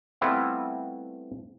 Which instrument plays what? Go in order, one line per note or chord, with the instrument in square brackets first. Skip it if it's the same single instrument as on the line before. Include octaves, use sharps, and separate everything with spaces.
[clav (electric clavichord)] G3 A3 B3 C4 E4 F4